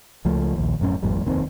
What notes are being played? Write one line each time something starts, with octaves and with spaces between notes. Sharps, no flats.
C#2 F3 A3
A#1 D#2
D1 F#2 A2 C#4
G#1 F2 A2 G3
F1 D#2 D#3 C4